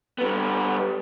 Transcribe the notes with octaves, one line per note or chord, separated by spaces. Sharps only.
G3 B3